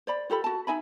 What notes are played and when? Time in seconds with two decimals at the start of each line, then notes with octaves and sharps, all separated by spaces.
0.07 C5 D5 B5
0.30 F4 G4 A4 B5
0.44 F#4 A5
0.67 D#4 E5 G#5 B5